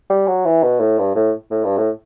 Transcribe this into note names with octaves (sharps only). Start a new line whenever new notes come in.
G3
F#3
E3
B2
A2
G2
A2
A2
G2
A2